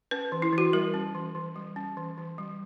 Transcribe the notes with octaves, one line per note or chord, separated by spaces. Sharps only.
C#4 B4
E3
E4
E3
F#4
G3 A#4
C#4
E3
E3
G3
C#4
E3
E3
G3